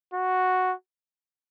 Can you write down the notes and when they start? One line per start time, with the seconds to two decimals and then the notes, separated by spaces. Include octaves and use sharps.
0.14 F#4